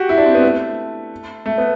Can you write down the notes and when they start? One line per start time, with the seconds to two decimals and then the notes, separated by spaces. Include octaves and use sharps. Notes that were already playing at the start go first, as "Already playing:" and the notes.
Already playing: F#4 G4
0.09 E4
0.18 D4
0.26 C4
0.35 B3
0.42 A3
1.46 A3
1.58 B3